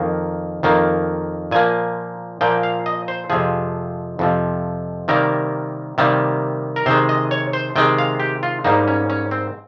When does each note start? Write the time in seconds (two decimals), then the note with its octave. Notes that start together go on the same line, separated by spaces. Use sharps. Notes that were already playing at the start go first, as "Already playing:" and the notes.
Already playing: F2 D#3 A#3
0.63 F2 D#3 A#3
1.51 A#2 F3 A#3 G#5
2.41 A#2 F3 A#3 G5
2.63 F5
2.86 D#5
3.08 C5
3.30 F2 C3 F3 G#4
4.19 F2 C3 F3
5.08 C3 D#3 G3 A#3 A#4
5.98 C3 D#3 G3 A#3
6.76 A#4
6.86 C3 D#3 G#3 C5
7.09 D#5
7.31 C#5
7.53 C5
7.76 C3 D#3 G#3 G5
7.98 F5
8.20 G4
8.43 F4
8.64 G#2 G3 A#3 D#4
8.88 C#4
9.10 C#4
9.31 C4